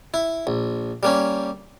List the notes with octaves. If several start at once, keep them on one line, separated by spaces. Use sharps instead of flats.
E4
A#1
G3 A#3 C#4